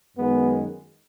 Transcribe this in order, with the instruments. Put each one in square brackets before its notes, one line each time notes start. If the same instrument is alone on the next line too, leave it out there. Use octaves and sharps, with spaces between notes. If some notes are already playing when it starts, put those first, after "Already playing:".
[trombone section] F#2 D#3 G#3 B3